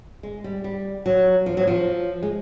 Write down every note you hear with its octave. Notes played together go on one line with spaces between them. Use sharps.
G#3
G3
G3
F#3
F3
F#3
F3
G#3